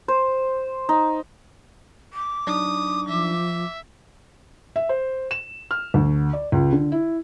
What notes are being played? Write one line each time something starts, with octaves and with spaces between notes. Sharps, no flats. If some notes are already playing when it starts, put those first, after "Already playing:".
C5
D#4
D6
F#3 D4 D#4 D#6
F3 E5
E5
C5
E7
F6
D2
D5
C#2
D3
E4